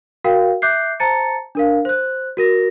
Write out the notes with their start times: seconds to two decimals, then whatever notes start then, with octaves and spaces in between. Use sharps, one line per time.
0.24 F#4 A#4 F5 G5
0.62 E5 D6 F#6 G6 C7
1.00 C5 A5 A#5 A6 C#7
1.55 D4 A#4 F5
1.85 C5 F#6
2.37 F#4 A#4 A#6